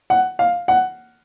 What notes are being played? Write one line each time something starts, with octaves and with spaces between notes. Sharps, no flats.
F#5
F5
F#5